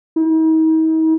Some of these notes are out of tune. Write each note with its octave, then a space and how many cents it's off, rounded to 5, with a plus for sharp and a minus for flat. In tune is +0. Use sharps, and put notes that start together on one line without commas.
D#4 +45